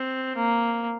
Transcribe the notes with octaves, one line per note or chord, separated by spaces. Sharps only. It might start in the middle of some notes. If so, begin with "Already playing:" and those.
Already playing: C4
A#3